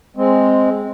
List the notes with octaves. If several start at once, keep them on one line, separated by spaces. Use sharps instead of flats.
G#3 C4